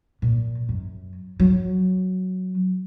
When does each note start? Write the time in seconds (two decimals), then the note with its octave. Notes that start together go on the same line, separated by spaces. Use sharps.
0.22 A#2
0.69 F#2
1.40 F#3